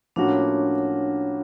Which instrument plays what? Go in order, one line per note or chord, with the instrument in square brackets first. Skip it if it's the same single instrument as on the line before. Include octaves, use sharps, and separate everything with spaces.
[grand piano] A2 F3 A#3 C#4 F#4 [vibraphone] D4